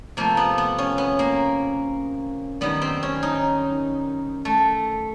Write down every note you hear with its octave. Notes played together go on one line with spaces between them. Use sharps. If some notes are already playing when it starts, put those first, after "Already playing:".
C3 F3 A3 A#3
B3
B3
C#4
B3
A#3
F#2 D#3 G3 B3
C4
C#4
D#4
A3